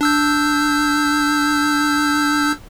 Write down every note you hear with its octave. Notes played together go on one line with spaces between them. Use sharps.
D4 E6 G6